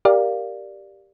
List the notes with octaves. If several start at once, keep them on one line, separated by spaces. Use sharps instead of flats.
G4 A#4 D5 F5